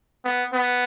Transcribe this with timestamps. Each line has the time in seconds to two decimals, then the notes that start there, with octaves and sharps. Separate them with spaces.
0.25 B3
0.53 B3